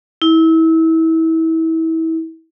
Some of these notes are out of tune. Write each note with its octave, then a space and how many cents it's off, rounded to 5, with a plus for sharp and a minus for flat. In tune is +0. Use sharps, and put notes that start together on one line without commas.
E4 -30